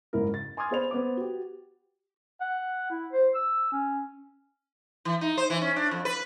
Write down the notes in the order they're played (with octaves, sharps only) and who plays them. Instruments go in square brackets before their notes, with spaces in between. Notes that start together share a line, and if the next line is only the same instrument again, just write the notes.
[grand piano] F#1 G#2 E4 A#4
A6
G#5 C6 D6 D#6 F6 G#6
B3 G#4 C5 D5 B5 F7
B3 C5 D6
F#4 G4
[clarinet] F#5
E4
C5
E6
C#4
[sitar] E3
D#4
C5
E3
C#4
D4
F2
B4